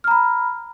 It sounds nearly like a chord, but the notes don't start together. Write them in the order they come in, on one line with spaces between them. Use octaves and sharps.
F6 A#5 B5